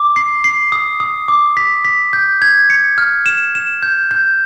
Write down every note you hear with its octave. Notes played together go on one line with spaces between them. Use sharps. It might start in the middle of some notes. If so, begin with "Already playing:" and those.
Already playing: D6
C7
C7
D#6
D#6
D6
B6
B6
G6
G#6
C#7
F6
E7
E7
G6
G6